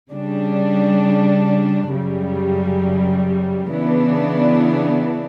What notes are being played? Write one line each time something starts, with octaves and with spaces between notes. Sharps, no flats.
C#3 G3 D4
F#2 C#3 G3
C#3 E3 B3 D4